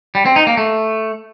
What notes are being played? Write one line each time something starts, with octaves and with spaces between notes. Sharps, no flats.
G3
C4
D#4
A#3
A3